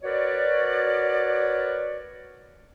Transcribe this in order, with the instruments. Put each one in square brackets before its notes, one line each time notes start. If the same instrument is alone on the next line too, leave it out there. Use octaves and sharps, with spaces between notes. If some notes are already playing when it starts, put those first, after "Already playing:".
[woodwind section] F#4 A#4 B4 C#5 D5